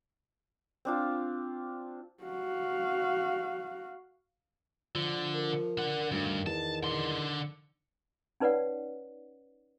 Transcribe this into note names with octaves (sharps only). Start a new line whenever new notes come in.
C4 D4 F4
F#4 F5
D3 F3
A#4
D4 F#5
D2 G2 D#3
E2 A5
D3 C6
C#4 D#4 B4 C#5 D5 F#5